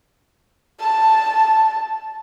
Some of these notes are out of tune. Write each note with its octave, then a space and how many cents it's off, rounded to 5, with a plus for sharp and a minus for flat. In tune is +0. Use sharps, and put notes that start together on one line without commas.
A5 +0